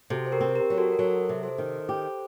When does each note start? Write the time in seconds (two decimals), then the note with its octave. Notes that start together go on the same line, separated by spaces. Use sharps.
0.10 C3 F#4 A4
0.26 C5
0.32 G4 A#4
0.40 C4
0.55 G4 A#4
0.70 F#3
0.77 F#4 A4
0.92 A#4
0.99 F#3 F#4 A4
1.29 C3
1.43 A4 C5
1.58 D#3
1.89 G4